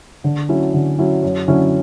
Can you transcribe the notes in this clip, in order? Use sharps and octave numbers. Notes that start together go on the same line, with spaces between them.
D3
F#3 C#4 E4
D3
F#3 C#4 E4
F#2
D3 F#3 C#4 E4